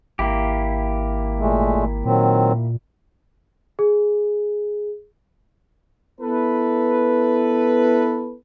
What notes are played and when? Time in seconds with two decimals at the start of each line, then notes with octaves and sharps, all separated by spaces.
0.19 G#1 A#3 E4 G4
1.39 A#2 G#3 A3
1.75 G#1
2.05 A#2 D#3 F#3 C4
3.79 G#4
6.21 B3 E4 A4 B4